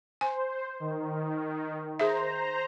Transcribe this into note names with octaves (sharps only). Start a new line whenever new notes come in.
C5 G#5
D#3
G#4 C5 E5 A#5